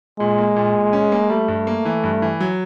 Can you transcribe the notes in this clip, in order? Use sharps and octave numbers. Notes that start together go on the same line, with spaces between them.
A#2 G#3
A#3
A#2
A#2
C#4
A#3
G3 A3
G2
A#3
E3
G2
E3
F#3